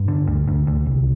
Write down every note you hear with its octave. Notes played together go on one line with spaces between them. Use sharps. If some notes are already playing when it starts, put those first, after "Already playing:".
Already playing: G2
D3
D2
D2
D2
C2